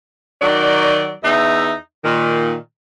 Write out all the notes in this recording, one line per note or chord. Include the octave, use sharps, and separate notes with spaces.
D#3 F#3 F#4 D5
E2 D#4 E5
A#2 D#3